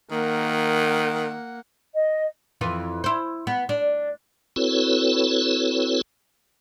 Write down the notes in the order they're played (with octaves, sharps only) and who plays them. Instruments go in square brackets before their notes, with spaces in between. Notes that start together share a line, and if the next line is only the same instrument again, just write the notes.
[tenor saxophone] D#3 [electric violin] A#3 F#5
[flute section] D#5
[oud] F2 E3 F4
E4 C5
B3
D4
[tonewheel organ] C4 E4 F#4 A4 B4 C#5